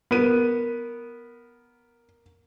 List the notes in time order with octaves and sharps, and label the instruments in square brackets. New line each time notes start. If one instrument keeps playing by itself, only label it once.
[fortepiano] B3 [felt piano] A#4 D#7